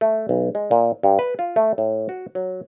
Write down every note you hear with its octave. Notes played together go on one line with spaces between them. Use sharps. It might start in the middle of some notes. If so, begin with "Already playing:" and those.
A3
B1
G#3
A#2
G2
B4
F4
A3
A2
F#4
F#3